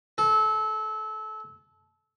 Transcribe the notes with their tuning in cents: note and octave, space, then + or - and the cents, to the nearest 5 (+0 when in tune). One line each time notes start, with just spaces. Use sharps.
A4 -25